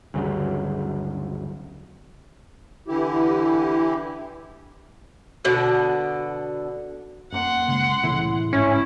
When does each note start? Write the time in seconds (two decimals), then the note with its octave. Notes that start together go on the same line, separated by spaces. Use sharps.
0.14 D2 G2 C#3 F#3
2.88 D3 E3 E4 G4
5.45 B2 D3
7.33 F#2 A#3 F#5 C6
7.68 C#3 G#3
8.03 C2 A2 C#3 E3 B3 E4
8.53 G#2 C#4 E4